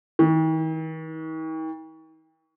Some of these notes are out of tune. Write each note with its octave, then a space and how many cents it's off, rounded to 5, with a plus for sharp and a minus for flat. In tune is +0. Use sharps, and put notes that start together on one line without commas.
D#3 +45